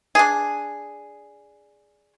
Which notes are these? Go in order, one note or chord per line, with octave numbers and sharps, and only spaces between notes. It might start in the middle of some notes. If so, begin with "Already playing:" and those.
D4 G#4